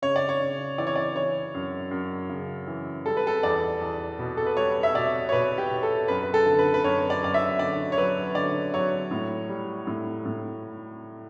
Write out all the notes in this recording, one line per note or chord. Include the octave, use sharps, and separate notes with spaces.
C#3 C#5
D5
C#5
C#3
E3 D5
C#5
D5
E3 C#5
F#2
F#2
C#3
E3
G3 A4
B4
A4
E2 D5
E2
B2
A4
B4
G3 C#5
E5
B2 D5
C#5
B2 B4
G4
B2
A4
F#2 B4
B4
A4
D3
B4
B4
F#2 C#5
D5
F#2 D5
E5
D3 D5
C#5
F#3 B4
D3 D5
F#3 C#5
A2
G3
A2
A2